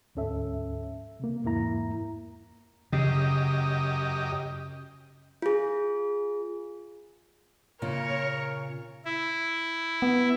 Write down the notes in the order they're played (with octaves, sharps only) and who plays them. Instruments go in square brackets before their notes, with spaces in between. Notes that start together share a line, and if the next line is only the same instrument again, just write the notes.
[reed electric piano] D2 G#2 C#4 A4 E5
C3 A#3
E2 G#2 A#3 E4 A#5
[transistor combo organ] F#2 G4 D#5 [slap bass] C#3
[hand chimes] F4 G#4
[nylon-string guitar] A#2 C#3 F4 [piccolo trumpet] A#4 [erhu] C#5
[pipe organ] E4
[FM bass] B3